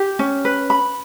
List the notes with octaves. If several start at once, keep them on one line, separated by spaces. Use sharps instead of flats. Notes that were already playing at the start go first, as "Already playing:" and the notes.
Already playing: G4
C#4
B4
B5